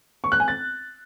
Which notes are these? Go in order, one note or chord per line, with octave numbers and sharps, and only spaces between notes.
C#6
F#6
G#5
A6